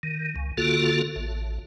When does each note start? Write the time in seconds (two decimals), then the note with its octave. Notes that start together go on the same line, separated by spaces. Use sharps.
0.03 D#3
0.36 C#2
0.57 D3 A#3 F4 F#4 A4
1.16 A1